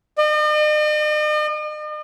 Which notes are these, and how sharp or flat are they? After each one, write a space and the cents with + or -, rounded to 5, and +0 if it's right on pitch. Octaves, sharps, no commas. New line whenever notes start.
D#5 -45